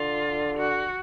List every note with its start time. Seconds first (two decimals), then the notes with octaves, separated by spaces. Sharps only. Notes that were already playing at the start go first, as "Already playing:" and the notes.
Already playing: D3 F4
0.57 F#4